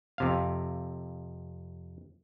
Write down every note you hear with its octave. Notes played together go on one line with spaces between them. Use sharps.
F2 C3 F5